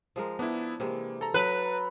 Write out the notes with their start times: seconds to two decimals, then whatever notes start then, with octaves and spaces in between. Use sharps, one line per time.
0.16 F3 G#3 A#4
0.39 B3 D4 E4
0.80 C3 E3 G#3 A#3
1.21 A4 A#5
1.34 F#3 B4